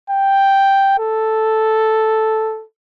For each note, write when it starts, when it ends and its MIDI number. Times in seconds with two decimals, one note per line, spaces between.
0.10 0.97 79
0.99 2.64 69